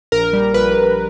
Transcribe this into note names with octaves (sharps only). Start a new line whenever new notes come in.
A#1 A#4
G3
A#1 B4
A#1